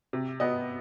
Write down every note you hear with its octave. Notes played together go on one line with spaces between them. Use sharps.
C3
B3 D#5